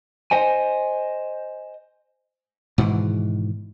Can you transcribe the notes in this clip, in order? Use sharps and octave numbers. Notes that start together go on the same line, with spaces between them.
C5 D#5 G#5
G#2 B2 D#3 E3